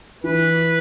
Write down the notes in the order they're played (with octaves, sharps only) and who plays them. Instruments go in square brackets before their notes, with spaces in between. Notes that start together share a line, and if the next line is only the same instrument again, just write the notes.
[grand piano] E3 [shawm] B4